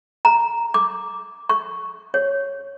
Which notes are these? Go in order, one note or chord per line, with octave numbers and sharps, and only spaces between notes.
A#5
D6
C#6
C#5